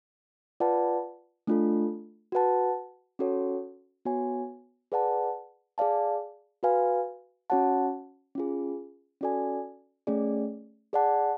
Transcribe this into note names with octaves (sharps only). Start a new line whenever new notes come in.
F4 B4 D5 F#5 A5
A3 D4 F4 A4
F#4 B4 F#5 A5
C#4 F#4 A4 C#5
B3 F#4 C#5 G#5
G#4 B4 D5 F#5 A5
G#4 D5 F5 A5
F#4 B4 F5 G#5
C#4 F#4 C#5 F#5 A5
C#4 F4 G#4
C#4 F#4 A4 D5 G#5
A3 C#4 G#4 D5
G#4 D5 F#5 A5